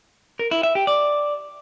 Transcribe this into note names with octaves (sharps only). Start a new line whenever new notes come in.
A#4
E4
E5
G4
D5